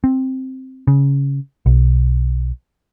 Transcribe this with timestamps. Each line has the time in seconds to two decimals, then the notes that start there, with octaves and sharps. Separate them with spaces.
0.04 C4
0.87 C#3
1.66 B1